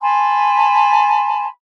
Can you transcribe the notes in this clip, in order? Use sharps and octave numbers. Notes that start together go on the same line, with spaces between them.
G#5 A5 B5 C6